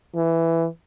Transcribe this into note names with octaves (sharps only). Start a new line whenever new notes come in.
E3